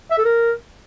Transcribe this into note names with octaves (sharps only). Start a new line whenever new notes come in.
E5
A4
A#4